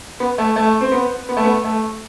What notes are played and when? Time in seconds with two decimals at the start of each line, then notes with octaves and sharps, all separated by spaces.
0.20 B3
0.38 A3
0.56 A3
0.81 C4
0.92 B3
1.29 B3
1.37 A3
1.44 B3
1.64 A3